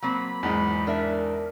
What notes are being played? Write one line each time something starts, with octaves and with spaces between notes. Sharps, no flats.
F#3 A#3 C4 B5
E2 G#2 D#4 B5
D4 A#4 E5